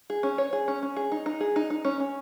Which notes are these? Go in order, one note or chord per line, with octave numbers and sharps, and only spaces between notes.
G#4
C#4
C#5
G#4
C#4
C#4
G#4
D#4
D#4
G#4
D#4
D#4
C#4
C#4